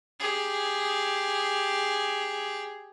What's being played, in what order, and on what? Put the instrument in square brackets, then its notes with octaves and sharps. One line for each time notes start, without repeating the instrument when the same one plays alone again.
[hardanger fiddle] G4 G#4